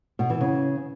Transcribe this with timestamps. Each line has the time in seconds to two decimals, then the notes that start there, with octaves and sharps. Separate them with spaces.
0.19 B2
0.30 E3
0.41 C#3